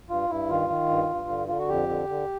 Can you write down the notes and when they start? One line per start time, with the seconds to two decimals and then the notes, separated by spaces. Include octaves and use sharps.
0.10 G2 F4
0.30 G2 E4
0.50 D#3 F4
0.69 D#3
0.89 G2
1.09 G2
1.29 D3
1.47 D3 F4
1.59 F#4
1.69 F2 G4
1.89 D3
2.09 D3